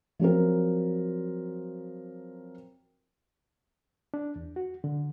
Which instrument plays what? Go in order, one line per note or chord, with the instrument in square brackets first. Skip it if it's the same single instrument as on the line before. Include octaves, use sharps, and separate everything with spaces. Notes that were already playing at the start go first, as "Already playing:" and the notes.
[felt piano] F3 F#3 C4 A#4
[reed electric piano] D4
E2
F#4
D3